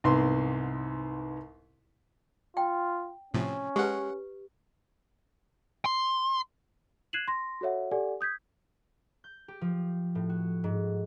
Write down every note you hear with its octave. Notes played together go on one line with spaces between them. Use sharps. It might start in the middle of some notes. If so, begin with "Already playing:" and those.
C2 G#2 B3 C6
F4 G5
A2 C3 F3 C#4
G#3 G4 B4 F#5
C6
F#6 G#6 C7 D#7 E7 F#7
C6 A#6
F#4 A4 C#5 E5 F#5
G4 A4 D5 F#5 G#5
D#6 G6 G#6 B6
G6
G4
F3
A2
F#4
G#2